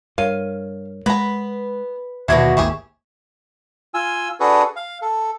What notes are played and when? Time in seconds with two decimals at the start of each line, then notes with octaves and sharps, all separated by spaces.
0.18 G2 A#4 C#5 F5 D#7
1.06 G#3 B3 B4 A#5
2.28 D#2 B2 D3 D4 E4 F#4 E5 G#6
2.57 G#1 D#2 E4 G4 G#4 C#6
3.94 F4 G#5 E6
4.40 D4 F#4 G#4 A4 B4
4.76 F5
5.02 A4